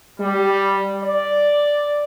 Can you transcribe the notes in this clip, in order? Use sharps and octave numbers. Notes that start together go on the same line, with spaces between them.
G3
D5